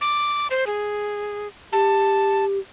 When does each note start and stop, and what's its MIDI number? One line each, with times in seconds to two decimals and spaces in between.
0.01 0.47 86
0.51 0.65 72
0.67 1.48 68
1.73 2.59 67
1.73 2.45 81